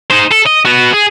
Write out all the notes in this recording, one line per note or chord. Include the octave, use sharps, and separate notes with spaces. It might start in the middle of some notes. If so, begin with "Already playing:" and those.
D#4 C5
A4
D#5
B3 F#4
G#4